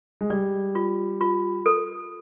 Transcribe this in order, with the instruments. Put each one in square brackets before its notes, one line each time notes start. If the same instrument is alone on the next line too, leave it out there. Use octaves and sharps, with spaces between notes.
[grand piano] G#3
[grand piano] G3 [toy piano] D5
[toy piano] F4
F4
A4